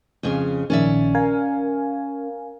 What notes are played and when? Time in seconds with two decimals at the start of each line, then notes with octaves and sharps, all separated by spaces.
0.23 F2 C#3 G#4
0.70 A#1 D#3 C#4 D5 E5
1.15 A#4 F5 G#5